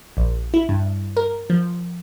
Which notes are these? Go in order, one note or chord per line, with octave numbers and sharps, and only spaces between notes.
A#1
E4
G2
A#4
F3